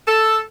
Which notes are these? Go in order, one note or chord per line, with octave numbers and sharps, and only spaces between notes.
A4